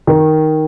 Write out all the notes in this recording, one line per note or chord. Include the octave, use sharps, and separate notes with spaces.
D#3